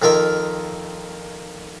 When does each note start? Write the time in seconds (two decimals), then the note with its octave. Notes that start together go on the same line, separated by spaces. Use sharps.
0.02 F2 D#3 F4 A#4 E5